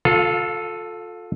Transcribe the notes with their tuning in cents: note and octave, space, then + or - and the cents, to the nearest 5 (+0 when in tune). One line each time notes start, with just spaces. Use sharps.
F4 +30 A4 +0 F5 +0